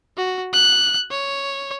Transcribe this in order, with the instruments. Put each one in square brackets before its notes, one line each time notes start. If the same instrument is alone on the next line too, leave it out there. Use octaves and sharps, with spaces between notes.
[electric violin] F#4
F#6
C#5